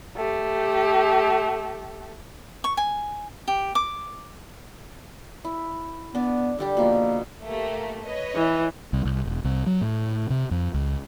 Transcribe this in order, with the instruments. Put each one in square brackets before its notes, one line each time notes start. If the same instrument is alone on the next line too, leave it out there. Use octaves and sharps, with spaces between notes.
[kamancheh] A3 G4
[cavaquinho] C#6
G#5
G4
D6
[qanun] E4
[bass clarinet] B3 [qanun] D4 D5
[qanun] D3 G3 G4
[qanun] B2 F3 [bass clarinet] A#3
[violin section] A3 A#3 G4
B4 C#5 D#5
[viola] E3
[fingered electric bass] C2
C2
E1
C2
F#3
A2
C3
F2
C#2